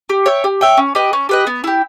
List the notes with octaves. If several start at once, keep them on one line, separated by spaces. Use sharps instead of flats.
G4
C#5 E5 G5
G4
C#5 E5 G5
C#4
G4 B4 D#5
C#4
G4 B4 D#5
B3
E4 G4